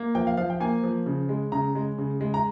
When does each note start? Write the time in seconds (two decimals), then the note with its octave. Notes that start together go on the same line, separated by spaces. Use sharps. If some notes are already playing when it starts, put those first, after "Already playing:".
Already playing: A#3
0.15 F3 G5
0.27 F5
0.37 F3 F5
0.50 G5
0.60 A#3 G#5
0.83 F3
1.06 C#3
1.29 G#3
1.52 C#3 A#5
1.75 G#3
1.98 C#3
2.21 G#3
2.34 A#5